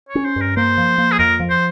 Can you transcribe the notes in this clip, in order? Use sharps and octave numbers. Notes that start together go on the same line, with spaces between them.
C#5
C#4
C5
G2 A#4
A#3 C5
F3
A#3
G#4
F2 A#4
F3
C5